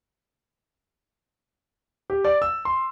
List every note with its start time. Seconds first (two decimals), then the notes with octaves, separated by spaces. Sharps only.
2.10 G4
2.25 D5
2.42 E6
2.65 C6